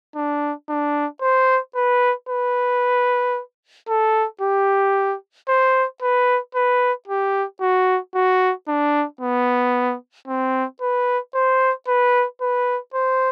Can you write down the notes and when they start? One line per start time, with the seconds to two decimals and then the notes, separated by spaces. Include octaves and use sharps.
0.15 D4
0.69 D4
1.22 C5
1.76 B4
2.29 B4
3.89 A4
4.41 G4
5.48 C5
6.02 B4
6.55 B4
7.08 G4
7.61 F#4
8.15 F#4
8.68 D4
9.21 B3
10.27 C4
10.81 B4
11.34 C5
11.88 B4
12.41 B4
12.94 C5